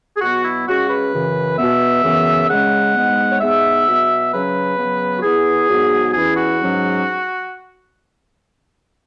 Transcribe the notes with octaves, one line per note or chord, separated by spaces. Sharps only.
G#4
B2 F#3 B3 F#4
E4
C#3 G#3 C#4 F#4
B4
F#2 C#3 E3
B2 B3 E5
F#2 C#3 E3 B3
C#3 G#3 C#4 F#5
G#2 G#3 B3
C#5
G#2 G#3 B3 E5
B2 F#3 B3
C#3 F#3 C#4 B4
C#3 F#3 B3
F#4
E2 E3 B3 G#4
G#2 F#3 B3
E2 E3 C#4 G#4
F#4
G#2 F#3 C#4